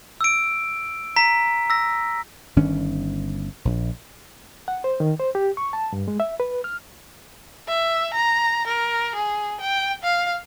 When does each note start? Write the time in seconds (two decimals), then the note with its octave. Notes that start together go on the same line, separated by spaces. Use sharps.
0.21 E6 D7
1.16 A#5 B6
1.70 E6 A#6
2.56 G1 D#3 C#4 D4
3.65 A#1
4.68 F#5
4.84 C5
5.00 D#3
5.19 C5
5.35 G4
5.57 C#6
5.73 A5
5.93 G2
6.08 G#3
6.20 E5
6.40 B4
6.64 F6
7.68 E5
8.14 A#5
8.67 A#4
9.15 G#4
9.61 G5
10.03 F5